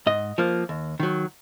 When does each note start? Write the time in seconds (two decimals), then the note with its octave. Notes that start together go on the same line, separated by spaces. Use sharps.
0.06 G#2 D#5
0.38 F3 A#3
0.69 D#2
1.00 D#3 F#3